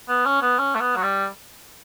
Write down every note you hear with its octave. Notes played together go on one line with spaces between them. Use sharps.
B3
C#4
B3
C#4
A3
B3
F#3
G3